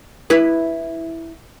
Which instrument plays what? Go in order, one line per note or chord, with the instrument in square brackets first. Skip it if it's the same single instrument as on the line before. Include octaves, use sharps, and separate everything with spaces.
[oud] E4 B4